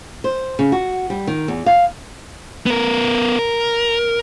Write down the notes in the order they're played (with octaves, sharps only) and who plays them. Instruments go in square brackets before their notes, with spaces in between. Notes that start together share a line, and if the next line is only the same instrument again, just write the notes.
[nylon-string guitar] C5
C#3
F#4
G3
D#3
E2
F5
[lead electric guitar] B3 A#4
A#4